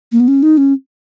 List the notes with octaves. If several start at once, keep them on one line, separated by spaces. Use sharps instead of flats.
A#3
B3
C#4
D#4
C#4